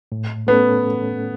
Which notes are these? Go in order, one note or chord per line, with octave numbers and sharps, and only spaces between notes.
A2
A3 B3 C#4 A4